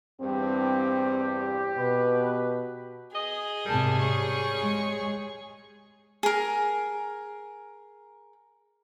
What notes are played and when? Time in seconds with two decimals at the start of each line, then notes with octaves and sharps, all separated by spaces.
0.22 E2 G2 C4 G4
1.78 B2 B4
3.15 G#4 D#5
3.66 G#2 C3 G3 A#4 A5
4.00 C#5 C#6
4.62 G#3
6.23 G#4 A#4